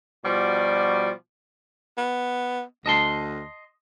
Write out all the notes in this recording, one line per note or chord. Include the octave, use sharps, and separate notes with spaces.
B2 F3 G3 F#4 D5
B3
D2 D#5 A5 C6